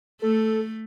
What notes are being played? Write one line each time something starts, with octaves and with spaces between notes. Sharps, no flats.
A3 A4